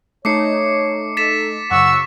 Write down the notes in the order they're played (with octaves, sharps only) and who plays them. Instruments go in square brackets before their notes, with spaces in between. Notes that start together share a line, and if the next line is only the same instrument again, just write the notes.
[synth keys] A3 D#4 [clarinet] C#5 [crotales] D6 C7 C#7
[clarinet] A4 [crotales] A6 B6 E7
[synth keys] F#2 C#3 [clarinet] F#5 [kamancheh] C#6 E6